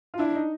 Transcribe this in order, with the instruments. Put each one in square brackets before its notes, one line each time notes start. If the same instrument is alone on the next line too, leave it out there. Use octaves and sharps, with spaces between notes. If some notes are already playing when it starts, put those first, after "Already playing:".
[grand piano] F4
[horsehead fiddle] D4 [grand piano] E4
[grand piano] D#4